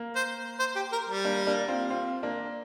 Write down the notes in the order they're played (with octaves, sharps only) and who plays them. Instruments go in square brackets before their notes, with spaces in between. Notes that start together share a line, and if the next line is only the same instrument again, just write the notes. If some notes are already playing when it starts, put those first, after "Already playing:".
Already playing: [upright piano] A#3
[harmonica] C5
C5
G4
A#4
G3
[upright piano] A#3 D4
A#3 D4
C4 F4
C4 F4
A#3 D4